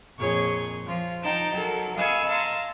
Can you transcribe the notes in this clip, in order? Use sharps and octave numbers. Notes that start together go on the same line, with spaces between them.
F2 A#2 G#4 C#5 C#6 G6
F3 F4
F3 D#4 G5 A5 A#5 G6
F#3 A4 A#4
D#5 F5 G#5 B5 C#6 E6
F5 A5 A#5 C6